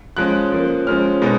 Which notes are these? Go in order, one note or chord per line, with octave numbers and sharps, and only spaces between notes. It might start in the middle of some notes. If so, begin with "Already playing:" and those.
F3 G#3 C#4 F#6
F3 A#3 C#4
F3 G#3 C#4 F6
B2 G#3 B3 D#4